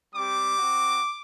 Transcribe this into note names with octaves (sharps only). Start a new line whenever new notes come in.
G3 C4 G4 D6
C4 F#4